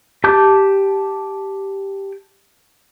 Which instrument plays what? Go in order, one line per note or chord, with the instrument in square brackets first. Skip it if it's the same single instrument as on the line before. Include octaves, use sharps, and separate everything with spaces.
[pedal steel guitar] G4 A5 D6 G6